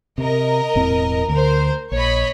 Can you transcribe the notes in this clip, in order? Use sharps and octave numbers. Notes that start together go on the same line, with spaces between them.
C3 A#4 D#5 A#5
E1 A2 C4
D2 A#4 C5
A#1 C#5 D#5 B5